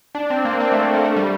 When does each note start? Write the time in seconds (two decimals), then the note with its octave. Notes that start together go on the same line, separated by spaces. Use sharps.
0.15 D4
0.30 C4
0.45 A#3
0.60 C4
0.72 A3
0.83 A3
0.94 A#3
1.04 A3
1.16 G3